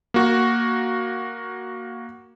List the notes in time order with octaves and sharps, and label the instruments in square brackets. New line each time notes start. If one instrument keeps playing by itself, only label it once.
[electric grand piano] A#3 F#4